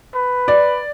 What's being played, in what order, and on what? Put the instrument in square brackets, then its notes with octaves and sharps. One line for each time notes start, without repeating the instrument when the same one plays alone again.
[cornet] B4
[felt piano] D5